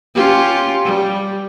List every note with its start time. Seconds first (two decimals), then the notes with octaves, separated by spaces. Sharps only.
0.15 C#4 F4 G4
0.85 G3